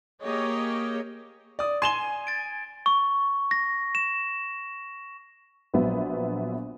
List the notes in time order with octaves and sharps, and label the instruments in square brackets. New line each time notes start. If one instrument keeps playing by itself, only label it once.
[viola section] A#3 G4 G#4 C#5 D#5
[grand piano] D5 D#6
[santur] G#5 [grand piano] C6 E7 G7
[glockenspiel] A6 D7
C#6
A#6
E7
[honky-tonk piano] A#1 F#3 B3 E5